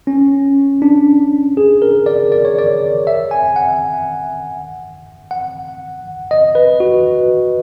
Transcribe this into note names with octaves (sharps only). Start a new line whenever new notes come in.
C#4
D4
G#4
A#4
D5
D5
C#5
D5
E5
G#5
F#5
F#5
D#5
B4
F#4